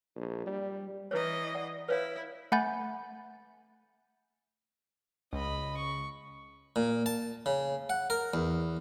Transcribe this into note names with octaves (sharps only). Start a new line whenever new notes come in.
A#1
G3
E3 E4 B4 C#5 D#5
D5 F#5
E4 B4 C#5 F5
A3 F#5 G#5 B5 G6 A6
C#2 D#5 B5
C#6
A#2
A5
C#3
F#5
A#4
E2